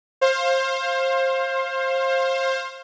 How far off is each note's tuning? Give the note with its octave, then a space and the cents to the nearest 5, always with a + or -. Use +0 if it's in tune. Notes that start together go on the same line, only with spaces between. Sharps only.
C5 +25 F5 +0